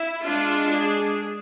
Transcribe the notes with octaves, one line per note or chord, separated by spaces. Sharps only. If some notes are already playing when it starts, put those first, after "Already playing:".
Already playing: E4
G#3 D4 F4
G#4